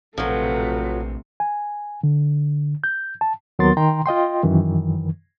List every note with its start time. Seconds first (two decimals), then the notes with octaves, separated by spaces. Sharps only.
0.18 A#1 A2 C3 F3 F#3 A4 B4
1.40 G#5
2.04 D3
2.84 G6
3.21 A5
3.59 D#2 F#3 B3 A#4 C6 A6
3.77 D#3 G5 A#5 C6
4.06 F4 D#5 G5 C6
4.43 F#2 D#3 E3